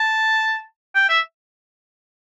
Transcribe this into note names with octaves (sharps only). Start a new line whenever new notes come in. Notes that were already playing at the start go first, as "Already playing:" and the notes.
Already playing: A5
G5
E5